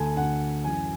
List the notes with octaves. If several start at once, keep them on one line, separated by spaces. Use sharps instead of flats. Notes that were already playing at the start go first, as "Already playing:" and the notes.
Already playing: D2 D3 G#5 A5
D2 D3 F#5
F#2 E3 G#5